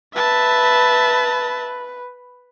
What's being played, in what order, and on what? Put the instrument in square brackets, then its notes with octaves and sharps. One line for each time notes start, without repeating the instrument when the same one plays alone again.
[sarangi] B4 [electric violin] E5 A5